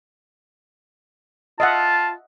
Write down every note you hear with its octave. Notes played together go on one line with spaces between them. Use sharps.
F4 D#5 E5 F#5 A5